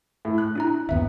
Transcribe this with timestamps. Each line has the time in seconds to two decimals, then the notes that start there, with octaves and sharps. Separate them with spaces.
0.25 A2
0.38 F#6
0.55 D4 E4 A#5
0.89 G1 D#2 B3 E5